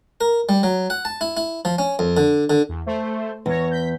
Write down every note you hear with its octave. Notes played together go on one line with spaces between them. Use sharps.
A#4
G3
F#3
F#5
A5
E4
E4
F3
C#4
F2
D3
D3
E2
A3 C5
E2 C#5 A#6
G6 B6